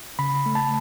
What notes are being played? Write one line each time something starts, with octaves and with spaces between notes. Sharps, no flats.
C#3 B5
A3
A5